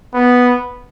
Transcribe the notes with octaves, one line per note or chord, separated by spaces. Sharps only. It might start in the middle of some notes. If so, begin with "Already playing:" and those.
B3